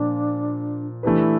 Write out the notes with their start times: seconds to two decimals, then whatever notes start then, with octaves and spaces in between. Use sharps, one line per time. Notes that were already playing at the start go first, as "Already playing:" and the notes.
Already playing: A#2 F3 A#3 D4
1.03 E3 A3 D4 E4 G4 B4